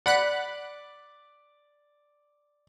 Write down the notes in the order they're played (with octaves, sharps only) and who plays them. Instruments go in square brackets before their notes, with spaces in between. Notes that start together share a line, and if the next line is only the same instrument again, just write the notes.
[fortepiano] D5 [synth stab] F#5 B5 F#6